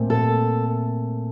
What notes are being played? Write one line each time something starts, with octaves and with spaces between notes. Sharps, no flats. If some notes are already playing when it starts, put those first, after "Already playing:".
Already playing: A#2 A3 C4
A4